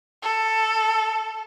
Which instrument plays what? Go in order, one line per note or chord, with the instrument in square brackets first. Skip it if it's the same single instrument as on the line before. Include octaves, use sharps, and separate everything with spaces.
[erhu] A4